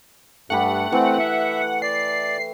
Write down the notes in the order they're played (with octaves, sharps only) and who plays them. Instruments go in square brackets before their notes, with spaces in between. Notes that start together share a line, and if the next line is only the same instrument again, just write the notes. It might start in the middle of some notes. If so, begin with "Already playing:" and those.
[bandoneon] G2 [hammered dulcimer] A3 G4 B5 [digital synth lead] F#5
[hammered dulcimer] E3 [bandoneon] A3 C4
[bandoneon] E5
[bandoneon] D5 [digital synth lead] C7